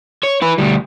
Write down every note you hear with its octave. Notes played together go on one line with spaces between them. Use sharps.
C#5
E4 B4
D2 G3